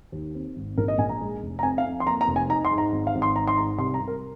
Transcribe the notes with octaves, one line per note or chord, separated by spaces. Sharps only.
D#2
C4
G#1
A#1 A#4
D#5
A#1 G#5
A#5
G#3
F1
A#5
F2 G#5
F5
F2
C6
A#3 A#5
A#5
F1
G#5
D#4 A#5
C6
G#2
A#5
G#1
F5
G#1
C6
D#4 A#5
C6
G#2 A#5
C2 C6
A#5
C2
A#4